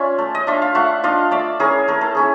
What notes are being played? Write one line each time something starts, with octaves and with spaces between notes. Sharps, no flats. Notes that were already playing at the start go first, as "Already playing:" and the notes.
Already playing: C#4 F4 D5 E5
A3
D#5
D4 F4 E5
F5
A3 E5 F#5
D4 F4 D#5 F5
A3 D5 E5
C#4 E4 G#4 A#4
A3 A#4
A4
C#4 E4 G#4